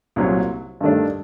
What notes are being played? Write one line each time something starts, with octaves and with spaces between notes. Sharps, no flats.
C2 A#2 F#3
G2 D#3 A3 D4